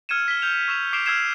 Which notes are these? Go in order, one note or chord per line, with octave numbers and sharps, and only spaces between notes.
E6 F6 G#6 C#7 D#7 E7
B6 G7
F6 G6 F7
C#6 E6 B6 E7 F7
D6 C7 D7 E7 F7 G7
E6 F6 G#6 C7 E7